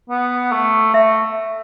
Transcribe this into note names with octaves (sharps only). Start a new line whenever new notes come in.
B3
A3
A3 E5